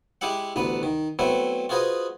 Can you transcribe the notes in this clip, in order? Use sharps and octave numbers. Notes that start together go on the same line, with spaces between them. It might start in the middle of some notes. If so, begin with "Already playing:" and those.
G#3 E4 G4 E5 F#5
A1 D2 B3 B4
D#3
F#3 A3 B3 C4 E4
F4 F#4 G#4 B4 C5 D#5